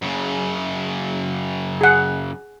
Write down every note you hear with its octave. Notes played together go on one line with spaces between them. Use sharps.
F#2 C#3
G#4 F#5